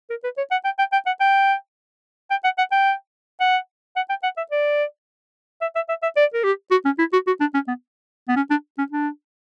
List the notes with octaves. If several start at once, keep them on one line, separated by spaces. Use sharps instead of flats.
A#4
B4
C#5
F#5
G5
G5
G5
F#5
G5
G5
F#5
F#5
G5
F#5
F#5
G5
F#5
E5
D5
E5
E5
E5
E5
D5
A#4
G4
F#4
C#4
E4
F#4
F#4
D4
C#4
B3
B3
C#4
D4
C#4
D4